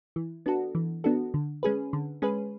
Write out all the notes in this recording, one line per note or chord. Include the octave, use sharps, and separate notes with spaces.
E3
B3 D4 F#4 A4
E3
B3 D4 F#4 A4
D3
G#3 C#4 G#4 B4
D3
G#3 C#4 G#4 B4